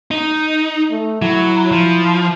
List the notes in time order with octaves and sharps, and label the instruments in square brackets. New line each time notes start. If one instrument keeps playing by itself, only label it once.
[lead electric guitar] D#4
[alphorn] A3
[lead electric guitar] F#3 [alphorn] E4
[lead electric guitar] F3